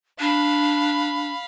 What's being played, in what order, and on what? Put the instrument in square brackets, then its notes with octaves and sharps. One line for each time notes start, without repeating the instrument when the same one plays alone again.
[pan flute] D4 [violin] F5 B5